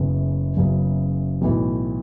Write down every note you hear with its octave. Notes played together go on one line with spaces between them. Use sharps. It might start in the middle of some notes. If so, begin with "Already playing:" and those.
Already playing: F#1 F#2 C#3 F#3 B3
F#1 F#2 C#3 F#3 B3
B1 A2 E3